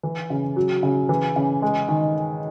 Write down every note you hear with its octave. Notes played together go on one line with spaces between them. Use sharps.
E3
C#3
F#3
C#3
E3
C#3
G#3
D#3